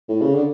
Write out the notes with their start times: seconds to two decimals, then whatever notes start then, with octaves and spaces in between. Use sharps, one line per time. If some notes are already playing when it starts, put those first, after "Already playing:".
0.09 A2
0.21 C#3
0.35 D3